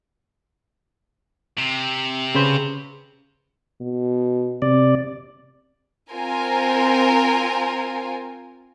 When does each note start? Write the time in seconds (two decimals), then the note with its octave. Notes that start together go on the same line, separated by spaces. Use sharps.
1.58 C3
2.35 C#3 B4 C5
3.81 B2
4.62 C3 D5
6.11 C4 F4 A#4 G#5